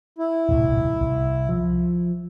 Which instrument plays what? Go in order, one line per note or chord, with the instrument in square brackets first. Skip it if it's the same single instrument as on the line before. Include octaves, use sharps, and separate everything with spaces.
[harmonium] E4
[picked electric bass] D#1 C2 A2
C2
F3